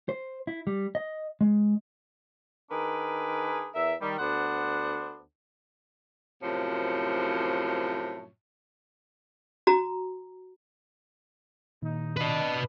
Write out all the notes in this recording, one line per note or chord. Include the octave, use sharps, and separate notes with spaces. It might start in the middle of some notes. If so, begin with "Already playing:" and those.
C5
E4
G3
D#5
G#3
D#3 D4 G#4 A#4 B4
E2 A#4 E5
D#3 G3
D2 B3 D4 C5 F#5
F#2 A2 C3 F3 C#5
F#4 A#5
C2 A#2 D#3 D#4
D4 B4 D#5